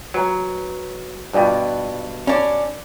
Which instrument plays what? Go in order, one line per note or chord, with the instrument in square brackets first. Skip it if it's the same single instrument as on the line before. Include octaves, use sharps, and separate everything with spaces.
[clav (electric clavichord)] F#3 [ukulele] B4 A#5
[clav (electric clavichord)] G2 B2 [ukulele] F4 D5 G5
[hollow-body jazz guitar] C#4 D4 [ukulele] B5